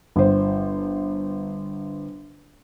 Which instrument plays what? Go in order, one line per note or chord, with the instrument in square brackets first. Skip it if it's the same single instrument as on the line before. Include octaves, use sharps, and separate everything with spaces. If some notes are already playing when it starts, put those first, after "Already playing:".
[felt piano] G1 C5